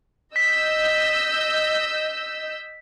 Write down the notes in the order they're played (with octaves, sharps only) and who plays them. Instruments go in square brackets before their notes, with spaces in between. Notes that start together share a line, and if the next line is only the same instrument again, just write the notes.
[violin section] D#5 E6 G6 [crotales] B6